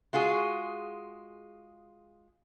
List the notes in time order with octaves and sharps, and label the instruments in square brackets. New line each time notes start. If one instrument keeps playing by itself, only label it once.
[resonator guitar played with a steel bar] G#3 F4 F#4 G#4